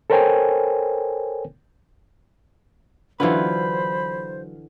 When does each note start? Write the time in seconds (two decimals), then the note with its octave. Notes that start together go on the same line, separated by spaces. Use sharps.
0.10 A4 A#4 C5 C#5 G5 G#5
3.20 D3 E3 F#3 F4 B4 C5 B5